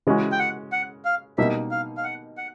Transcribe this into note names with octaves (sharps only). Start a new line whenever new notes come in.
C#3 E3 G#3 C#4 F#4
G5
F#5
F#5
F5
B2 G3 A#3 D#4 E5
F5
F5
F#5
F#5